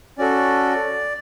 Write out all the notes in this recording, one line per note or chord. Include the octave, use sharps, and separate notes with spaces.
C#4 F#4 A4 D5